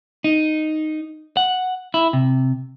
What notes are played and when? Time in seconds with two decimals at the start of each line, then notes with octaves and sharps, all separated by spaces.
0.24 D#4
1.37 F#5
1.94 E4
2.13 C3